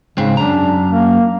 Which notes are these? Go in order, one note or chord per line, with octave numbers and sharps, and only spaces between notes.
G#2 C#3 C4
F#2 D4 A#5
A#3